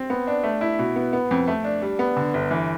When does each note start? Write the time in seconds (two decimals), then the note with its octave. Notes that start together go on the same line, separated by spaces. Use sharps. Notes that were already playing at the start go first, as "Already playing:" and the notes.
Already playing: C4
0.10 B3
0.27 D4
0.43 A3
0.61 E4
0.79 B2
0.96 B3
1.13 B3
1.31 F2
1.47 A3
1.64 D4
1.82 G3
1.99 B3
2.17 D3
2.34 G1
2.51 E3